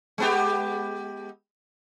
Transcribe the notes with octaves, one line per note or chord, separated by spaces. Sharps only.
G#3 B3 G4